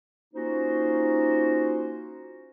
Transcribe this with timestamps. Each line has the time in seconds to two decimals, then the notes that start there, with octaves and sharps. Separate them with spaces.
0.34 A#3 C#4 D#4 F4 F#4 C5